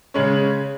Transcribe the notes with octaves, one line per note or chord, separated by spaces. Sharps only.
C#3 G#3 C#4